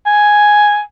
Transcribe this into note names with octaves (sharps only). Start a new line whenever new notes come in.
G#5